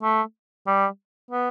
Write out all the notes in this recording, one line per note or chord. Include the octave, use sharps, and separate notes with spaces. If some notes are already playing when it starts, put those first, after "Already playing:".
A3
G3
B3